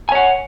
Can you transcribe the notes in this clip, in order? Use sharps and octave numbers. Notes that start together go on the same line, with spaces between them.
C#5 F#5 G#5